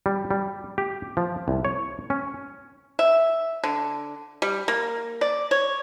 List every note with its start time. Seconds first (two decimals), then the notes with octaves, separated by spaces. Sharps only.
0.06 G3
0.31 G3
0.78 G4
1.17 F3
1.48 C2
1.65 C#5
2.10 C#4
2.99 E5
3.64 D3
4.42 G3
4.68 A#3
5.21 D5
5.51 C#5